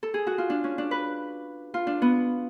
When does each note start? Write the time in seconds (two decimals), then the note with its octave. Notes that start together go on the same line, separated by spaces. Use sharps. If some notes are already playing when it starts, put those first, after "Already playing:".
0.03 A4
0.14 G#4
0.27 F#4
0.38 F4
0.50 D4
0.64 C#4
0.78 D4
0.91 B4
1.74 F4
1.87 D4
2.02 B3